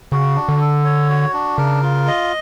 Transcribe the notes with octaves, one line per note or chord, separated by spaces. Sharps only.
C#3 F#4
D4
D3
A4
C#5
F#4
D4
C#3 A#4
F4
D#5